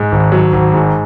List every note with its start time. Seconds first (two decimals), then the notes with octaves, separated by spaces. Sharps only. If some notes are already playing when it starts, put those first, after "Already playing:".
Already playing: G#2
0.12 G#1
0.32 F#3
0.53 G#1
0.73 G#2